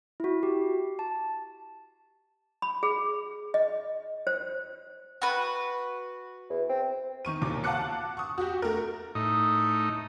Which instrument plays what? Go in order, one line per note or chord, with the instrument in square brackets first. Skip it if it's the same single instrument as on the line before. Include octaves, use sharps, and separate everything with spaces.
[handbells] E4 F#4
G4
A5
[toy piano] B5
G#4
D#5
C5
[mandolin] F#4 B4
[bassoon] E2
C4
[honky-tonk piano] D#3 C#6 D#7
D#2 A#2 A#3 D6
F5 F#5 A5 D6 F#6 C#7
C#6 D#6
F#4 G4
A3 A#4
[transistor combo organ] A2 D#4